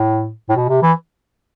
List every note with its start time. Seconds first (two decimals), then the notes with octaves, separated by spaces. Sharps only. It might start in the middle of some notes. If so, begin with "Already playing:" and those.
Already playing: A2
0.49 A2
0.56 B2
0.69 C3
0.83 E3